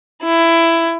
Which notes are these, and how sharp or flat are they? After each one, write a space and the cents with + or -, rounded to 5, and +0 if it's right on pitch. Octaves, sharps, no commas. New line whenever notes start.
E4 +15